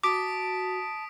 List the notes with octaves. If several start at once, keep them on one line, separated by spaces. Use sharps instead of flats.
F#4 A5 D6 D#6 B6 D7